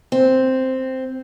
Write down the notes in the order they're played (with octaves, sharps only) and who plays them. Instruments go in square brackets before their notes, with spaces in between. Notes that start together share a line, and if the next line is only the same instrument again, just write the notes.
[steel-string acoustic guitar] C4